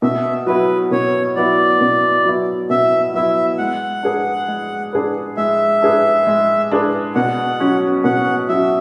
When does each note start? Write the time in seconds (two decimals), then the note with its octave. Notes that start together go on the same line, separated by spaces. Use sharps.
0.02 B2 E5
0.46 F#3 B3 E4 B4
0.91 B2 C#5
1.35 F#3 B3 E4 D5
1.81 B2
2.25 F#3 B3 E4
2.70 B2 E5
3.14 F#3 B3 E4 E5
3.58 G#3 F#5
4.03 D4 G#4 B4
4.48 G#3
4.93 D4 G#4 B4
5.37 G#3 E5
5.82 D4 G#4 B4
6.27 G#3
6.71 D4 G#4 B4
7.15 B2 F#5
7.60 F#3 C#4
8.04 B2 F#5
8.49 F#3 C#4 E5